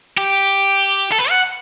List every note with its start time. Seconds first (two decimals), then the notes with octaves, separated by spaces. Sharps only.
0.17 G4
1.12 A4
1.19 B4
1.30 F#5